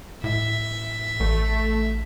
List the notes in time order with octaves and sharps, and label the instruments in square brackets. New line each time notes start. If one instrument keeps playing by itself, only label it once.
[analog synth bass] A2 [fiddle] E5
[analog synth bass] A1 [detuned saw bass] A3